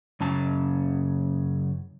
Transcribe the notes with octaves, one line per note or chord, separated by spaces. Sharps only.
F#2 C#3 A5